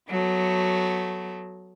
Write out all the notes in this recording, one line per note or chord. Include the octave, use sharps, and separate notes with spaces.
F#3 A3 B3